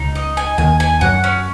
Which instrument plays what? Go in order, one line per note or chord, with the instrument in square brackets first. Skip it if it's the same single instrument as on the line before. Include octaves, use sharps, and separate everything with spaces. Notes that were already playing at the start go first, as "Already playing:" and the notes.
Already playing: [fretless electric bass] C#2 C#3 [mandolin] D#4
[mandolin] D#5
G#5
[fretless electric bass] D#2 D#3 [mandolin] G#5
[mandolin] G#5
[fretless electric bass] F#2 F#3 [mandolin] F#5
[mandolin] C#4